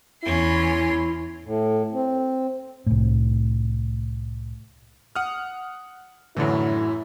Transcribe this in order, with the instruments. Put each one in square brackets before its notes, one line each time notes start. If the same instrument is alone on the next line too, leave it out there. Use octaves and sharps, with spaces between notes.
[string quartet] E2 C#4 C6 [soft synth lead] E4
[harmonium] A2
C4
[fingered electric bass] C2 A2
[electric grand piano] F#5 D#6 F6
[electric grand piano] F#2 E3 [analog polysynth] A2 D3 F#3 [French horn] E4